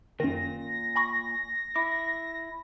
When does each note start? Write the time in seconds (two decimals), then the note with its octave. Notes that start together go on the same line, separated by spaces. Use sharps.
0.20 F#2 A#2 D#3 A#6
0.96 G#5 B5 C#6
1.76 E4 D6